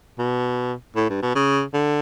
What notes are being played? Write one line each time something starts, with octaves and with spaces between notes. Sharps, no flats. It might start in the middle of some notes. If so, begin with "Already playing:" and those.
B2
A2
G2
B2
C#3
D3